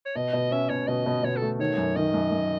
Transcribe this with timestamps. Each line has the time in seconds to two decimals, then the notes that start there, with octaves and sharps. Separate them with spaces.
0.05 C#5
0.16 B2 D#5
0.33 B2
0.51 C#4 E5
0.69 B2 C#5
0.87 B2 D#5
1.06 B2
1.23 B2 C#5
1.36 A4
1.42 A3
1.59 D#3 C#5
1.78 F#2
1.96 D#3 D#5
2.14 F#2
2.32 F#2